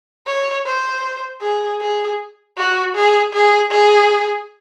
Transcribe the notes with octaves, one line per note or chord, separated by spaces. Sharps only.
C#5
C5
G#4
G#4
F#4
G#4
G#4
G#4